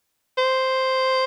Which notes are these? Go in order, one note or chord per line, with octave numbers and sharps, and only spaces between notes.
C5